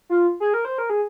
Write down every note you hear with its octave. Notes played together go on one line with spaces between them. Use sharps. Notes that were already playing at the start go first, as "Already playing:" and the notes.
F4
G#4
A#4
C5
A#4
G#4